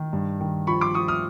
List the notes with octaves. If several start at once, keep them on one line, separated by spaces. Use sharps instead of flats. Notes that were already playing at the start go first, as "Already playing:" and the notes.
Already playing: D#3
G2
D#3
F3 B5 C#6
C6 D6
F3 C#6 D#6
D#6 F6